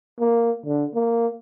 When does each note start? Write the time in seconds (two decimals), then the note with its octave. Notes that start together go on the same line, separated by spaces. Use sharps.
0.20 A#3
0.66 D3
0.94 A#3